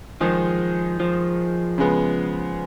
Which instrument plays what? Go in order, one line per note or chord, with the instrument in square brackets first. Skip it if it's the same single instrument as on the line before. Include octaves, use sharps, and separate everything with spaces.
[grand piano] D#3 G#3 D#4 G#4 [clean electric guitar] F3
[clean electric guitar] F3
[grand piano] C#3 G#3 B3